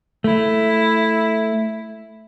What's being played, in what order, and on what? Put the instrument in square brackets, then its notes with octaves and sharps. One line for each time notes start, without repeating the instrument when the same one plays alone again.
[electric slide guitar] A3 [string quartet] E4